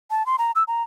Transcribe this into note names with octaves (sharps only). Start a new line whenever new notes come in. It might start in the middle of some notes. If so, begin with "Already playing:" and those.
A5
C6
A#5
E6
A#5